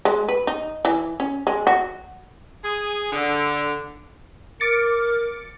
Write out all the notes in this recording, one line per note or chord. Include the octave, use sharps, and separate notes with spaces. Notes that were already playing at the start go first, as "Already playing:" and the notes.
G#3
B4
D#4
E3
C#4
G#3
F#4
G#4
D3
A#4 D6 A6 C#7